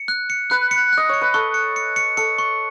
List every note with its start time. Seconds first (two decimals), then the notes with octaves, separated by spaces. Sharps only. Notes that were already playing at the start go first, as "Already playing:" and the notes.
Already playing: C#7
0.08 F#6
0.30 C#7
0.50 B4 F#6
0.71 C#7
0.93 D#5 F#6
1.09 C#5 C#7
1.21 B4
1.34 A4 C#6
1.54 C#7
1.76 C#7
1.96 C#7
2.17 A4 C#7
2.38 C#6